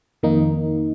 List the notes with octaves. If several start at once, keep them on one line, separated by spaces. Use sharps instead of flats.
F2 D#3 A#3 D#4